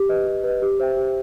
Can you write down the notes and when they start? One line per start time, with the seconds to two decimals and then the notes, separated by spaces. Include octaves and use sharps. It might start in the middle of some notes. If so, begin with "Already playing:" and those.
Already playing: G4
0.09 B4 D#5
0.27 G4
0.44 B4 D#5
0.62 G4
0.79 C5 E5 G5
0.97 G4